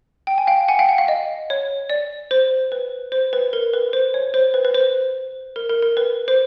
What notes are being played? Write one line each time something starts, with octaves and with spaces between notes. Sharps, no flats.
G5
G#5
F5 G5
F#5 G#5
F5 G5
F#5
F5
D#5
C#5
D5
C5
B4
C5
B4
A#4
B4
C5
C#5
C5
B4
B4
C5
A#4
A#4
A#4
B4
C5